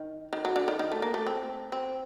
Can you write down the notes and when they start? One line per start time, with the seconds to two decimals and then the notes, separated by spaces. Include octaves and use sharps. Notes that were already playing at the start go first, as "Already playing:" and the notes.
Already playing: D#3
0.33 D#3
0.45 F#3
0.56 D3
0.68 D#3
0.79 D#3
0.92 A3
1.02 A#3
1.14 A3
1.26 C4
1.72 C4